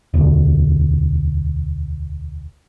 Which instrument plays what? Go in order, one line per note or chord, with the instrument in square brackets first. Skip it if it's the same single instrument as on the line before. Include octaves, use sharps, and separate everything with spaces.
[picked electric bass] E1 D2